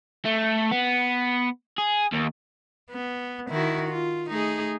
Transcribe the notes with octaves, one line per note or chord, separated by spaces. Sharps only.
A3
B3
G#4
D#2
B3
D#3 E4 F#4
F4
A3 D#4 G#4